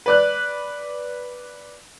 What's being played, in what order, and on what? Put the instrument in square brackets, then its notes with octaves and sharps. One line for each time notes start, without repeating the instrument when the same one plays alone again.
[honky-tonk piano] B4 D5 F#6